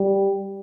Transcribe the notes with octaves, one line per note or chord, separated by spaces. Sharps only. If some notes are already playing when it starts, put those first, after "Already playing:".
Already playing: G3